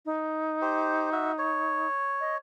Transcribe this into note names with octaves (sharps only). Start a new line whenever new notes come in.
D#4
G4 C5
F#4 E5
C#5
D#5